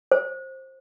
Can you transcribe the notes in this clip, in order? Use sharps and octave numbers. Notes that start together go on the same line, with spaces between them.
C5